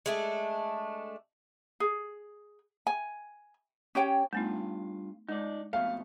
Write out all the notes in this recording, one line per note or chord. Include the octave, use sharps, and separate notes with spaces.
G#3 A3 D4
G#4
G#5
C#4 G4 C#5 G5
G2 A3 B3 D#4 F4
G#3 D#4 D5
F2 B2 A3 E5 F5